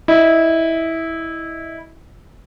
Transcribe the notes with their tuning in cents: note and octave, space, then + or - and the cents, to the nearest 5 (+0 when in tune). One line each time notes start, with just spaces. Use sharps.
E4 -15 D#5 -10